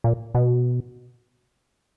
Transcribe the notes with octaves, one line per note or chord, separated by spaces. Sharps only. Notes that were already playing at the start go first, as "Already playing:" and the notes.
A#2
B2